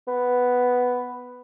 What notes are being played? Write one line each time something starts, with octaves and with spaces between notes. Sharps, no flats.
B3